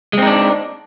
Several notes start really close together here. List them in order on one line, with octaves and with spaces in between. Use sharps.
G#3 C4 D#4 D4